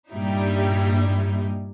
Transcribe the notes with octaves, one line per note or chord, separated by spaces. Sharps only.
G2 A#2 G3 D#4 E4